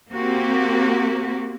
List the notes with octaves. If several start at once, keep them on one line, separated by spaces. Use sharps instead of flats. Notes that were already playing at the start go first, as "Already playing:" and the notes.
A#3 C4 F#4 G4